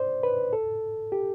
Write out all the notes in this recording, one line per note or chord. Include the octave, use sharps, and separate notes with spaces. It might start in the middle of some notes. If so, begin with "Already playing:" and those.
Already playing: C5 D5
B4
A4
G4